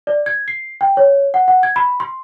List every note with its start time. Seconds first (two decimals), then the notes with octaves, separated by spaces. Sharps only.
0.07 D5
0.26 G#6
0.48 C7
0.81 G5
0.97 C#5
1.34 F#5
1.48 F#5
1.63 G#6
1.76 B5
2.00 C6